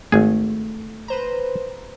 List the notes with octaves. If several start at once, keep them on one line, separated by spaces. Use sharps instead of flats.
G#1 A3 G#4
B4 C5 A#5